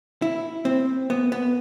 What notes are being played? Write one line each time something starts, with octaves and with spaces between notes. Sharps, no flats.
E4
C4
B3
B3